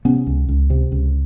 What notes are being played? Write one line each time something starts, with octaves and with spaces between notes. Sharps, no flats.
C3 B3 C#4
C#2
C#2
C3
C#2